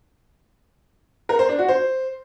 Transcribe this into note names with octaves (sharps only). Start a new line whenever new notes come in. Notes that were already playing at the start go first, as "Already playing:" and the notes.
A#4
C5
D4
F#4
C5